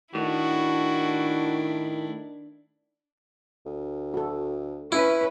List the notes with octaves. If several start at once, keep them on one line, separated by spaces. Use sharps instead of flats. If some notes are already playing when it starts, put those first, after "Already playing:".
A2 D#3 D4 E4 F#4
D2
F#4 A4
C#4 E4 B4